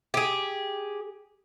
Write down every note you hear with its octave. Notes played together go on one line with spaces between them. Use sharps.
G4 G#4